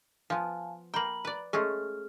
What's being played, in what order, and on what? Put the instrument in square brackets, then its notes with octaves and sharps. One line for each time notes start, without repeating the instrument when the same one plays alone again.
[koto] F3 B3 [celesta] F5 G#5 A5
[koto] A#3 G5 [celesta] A#5 B5 F#7
[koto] B4 D5
[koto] G#3 A3 C#4 [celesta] G#4 F6